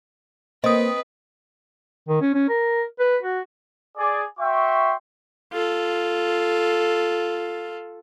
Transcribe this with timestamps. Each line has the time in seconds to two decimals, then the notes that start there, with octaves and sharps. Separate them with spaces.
0.64 A#3 C4 B4 D#5 D#6
2.09 D#3
2.22 C#4
2.34 C#4
2.49 A#4
3.00 B4
3.23 F#4
3.96 G#4 D5
4.39 F#4 E5 G5 C6 C#6
5.52 F4 A4